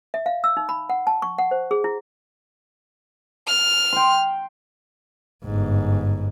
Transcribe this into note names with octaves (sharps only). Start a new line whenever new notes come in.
E5
F5
E6
D#4
B5
F#5
A5
C#6
F#5
C5
G#4
E4
F6
G5 C6
G1 G#2